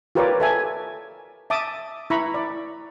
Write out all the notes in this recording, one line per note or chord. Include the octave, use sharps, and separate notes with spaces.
F4 G4 A#4 B4 C#5 D5
A4 E5 G#5
E5 A5 D6 D#6
E4 A#5 B5 C#6
D5